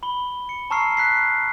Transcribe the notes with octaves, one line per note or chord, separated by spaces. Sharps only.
B5 G7
C#7
A5 A#5 C#6 E6 F6 C7
F6 F#6 B6 C7